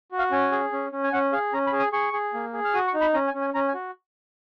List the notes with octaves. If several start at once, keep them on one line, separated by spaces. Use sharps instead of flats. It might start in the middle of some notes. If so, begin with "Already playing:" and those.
F#4
F5
C#4 G#5
G#4
C#4
C#4
G#5
C#4 F#5
G#4 F5
C#4 A#5
B5
G#4
D#6
G#4 C#6
G#4
A#3
G#4
F6
F#4 D#6
C#6
D#4
B5
C#4 A#5
G#5
C#4
G#5
C#4 A#5
G#5
F#4